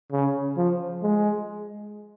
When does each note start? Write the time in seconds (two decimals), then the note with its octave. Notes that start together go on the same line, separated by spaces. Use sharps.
0.12 C#3
0.57 F3
1.03 G#3